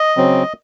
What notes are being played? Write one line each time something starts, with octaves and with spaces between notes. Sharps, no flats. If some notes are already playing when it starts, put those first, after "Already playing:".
Already playing: D#5
C#3 F#3 C4